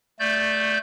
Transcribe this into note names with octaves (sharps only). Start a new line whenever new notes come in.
A3 D5 G6